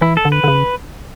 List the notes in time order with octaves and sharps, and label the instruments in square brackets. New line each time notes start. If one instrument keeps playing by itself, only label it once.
[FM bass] E3 [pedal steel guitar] E4
[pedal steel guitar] A4
[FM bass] D3
[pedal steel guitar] B4
[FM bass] D3
C#3